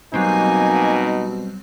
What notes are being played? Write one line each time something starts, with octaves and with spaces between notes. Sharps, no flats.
B2 F#3 G3 A#3 C4 D#4 G#5